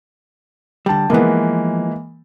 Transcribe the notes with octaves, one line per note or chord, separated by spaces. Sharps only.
D3 G3 G5 A5
E3 F3 G#3 A#3 B3